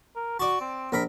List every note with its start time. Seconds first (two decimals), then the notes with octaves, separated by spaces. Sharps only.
0.16 A#4
0.39 F#4 D5 A5
0.61 C4
0.92 A#1 A#4 B5